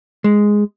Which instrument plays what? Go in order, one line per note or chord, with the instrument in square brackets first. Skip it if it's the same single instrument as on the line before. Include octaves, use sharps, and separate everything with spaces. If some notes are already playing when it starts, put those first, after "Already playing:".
[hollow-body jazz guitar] G#3